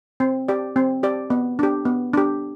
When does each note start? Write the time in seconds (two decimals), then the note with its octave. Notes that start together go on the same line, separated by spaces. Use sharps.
0.20 C4
0.48 G4 D5
0.76 C4
1.03 G4 D5
1.30 B3
1.59 D4 G4
1.85 B3
2.13 D4 G4